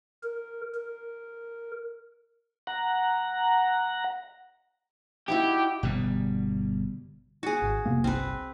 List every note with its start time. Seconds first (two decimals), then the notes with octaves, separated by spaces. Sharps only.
0.23 A#4
0.74 A#4
2.67 F#5 A#5
5.28 D#4 E4 F#4 G4
5.83 G1 B2 G3
7.43 F#4 G#4
7.62 G#1
7.86 F1 C3 A#3
8.04 G1 C2 C4 B4